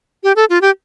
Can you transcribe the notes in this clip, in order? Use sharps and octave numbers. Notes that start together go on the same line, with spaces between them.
G4
A4
F4
G4